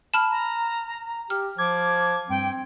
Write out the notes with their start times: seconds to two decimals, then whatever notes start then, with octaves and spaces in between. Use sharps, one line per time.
0.14 A5 B5 F6
0.30 A#5
1.30 G4 F6
1.58 F3 D6 G#6
2.29 G2 C4 G5